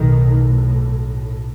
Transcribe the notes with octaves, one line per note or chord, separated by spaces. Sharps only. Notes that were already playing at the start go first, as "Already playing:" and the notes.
Already playing: B1 A2 D#3